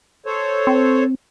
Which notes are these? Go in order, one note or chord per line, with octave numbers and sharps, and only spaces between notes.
A4 C5 C#5
C4